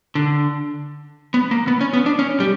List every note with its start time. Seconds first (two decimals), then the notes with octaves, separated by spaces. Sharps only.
0.15 D3
1.34 B3
1.51 A#3
1.68 B3
1.81 C#4
1.93 B3
2.06 D4
2.19 C#4
2.40 G3